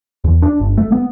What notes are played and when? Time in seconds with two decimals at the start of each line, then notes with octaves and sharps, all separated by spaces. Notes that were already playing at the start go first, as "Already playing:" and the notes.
0.24 E2
0.42 D4
0.60 G1
0.78 A3
0.92 B3